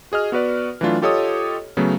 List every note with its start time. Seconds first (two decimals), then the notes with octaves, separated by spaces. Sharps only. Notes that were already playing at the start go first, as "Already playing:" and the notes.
0.12 F#4 G#4 D#5 F6
0.32 B3 F#4 B4 D5
0.81 E3 F#3 A3 D4 F4
1.02 F4 G4 A4 C#5 D#5 D#6
1.77 C#3 F#3 A3 B3